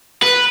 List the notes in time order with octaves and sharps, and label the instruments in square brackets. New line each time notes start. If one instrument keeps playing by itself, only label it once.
[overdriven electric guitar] B4